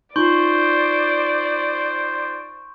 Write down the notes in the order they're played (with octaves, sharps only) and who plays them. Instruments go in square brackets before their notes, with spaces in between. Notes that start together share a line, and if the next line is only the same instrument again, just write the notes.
[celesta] D#4 F4 [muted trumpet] C5 [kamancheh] D5 [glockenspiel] C6 C#6 G6